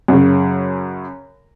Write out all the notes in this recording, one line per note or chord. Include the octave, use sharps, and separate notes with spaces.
F#2 C#3